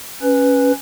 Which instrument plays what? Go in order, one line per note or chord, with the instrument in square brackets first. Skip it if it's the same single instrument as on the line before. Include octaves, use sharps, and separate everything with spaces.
[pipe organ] C#4 B4